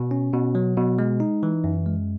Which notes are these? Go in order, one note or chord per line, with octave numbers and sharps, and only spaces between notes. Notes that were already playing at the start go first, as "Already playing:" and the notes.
Already playing: B2
C#4
B2
F#3
B2
G#3
D#4
E3
F#2
G#3